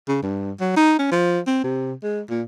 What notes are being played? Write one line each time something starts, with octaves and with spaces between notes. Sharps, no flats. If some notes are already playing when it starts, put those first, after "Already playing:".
C#3
G2
F#3
D#4
C#4
F3
C4
C3
G#3
A#2